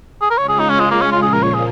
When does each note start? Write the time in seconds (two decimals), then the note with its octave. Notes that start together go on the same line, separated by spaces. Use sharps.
0.22 G#4
0.30 A#4
0.38 C#3 G#3 C#4 F4 C#5
0.49 G#4
0.60 D#4
0.70 C#4
0.80 G#3
0.91 A#3
1.01 C#4
1.12 F4
1.22 A#2 F3 A#3 G#4
1.33 A#4
1.43 C#5
1.54 G#4